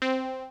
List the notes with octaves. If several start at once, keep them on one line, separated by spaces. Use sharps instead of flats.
C4